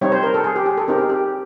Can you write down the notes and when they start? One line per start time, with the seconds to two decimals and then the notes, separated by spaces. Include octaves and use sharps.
0.01 G3 C4 D#4 C#5
0.12 C5
0.23 A#4
0.34 A4
0.44 G#4
0.56 G4
0.66 G#4
0.77 A4
0.88 C4 D#4 G4 A#4
0.98 G#4
1.09 G4